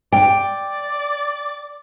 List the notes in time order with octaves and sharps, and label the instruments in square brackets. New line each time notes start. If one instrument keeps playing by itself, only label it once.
[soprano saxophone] D5 [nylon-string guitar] G5